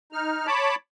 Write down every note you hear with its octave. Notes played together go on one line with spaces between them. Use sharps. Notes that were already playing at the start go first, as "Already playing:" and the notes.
D#4 F6
C#5 A5 B5 D6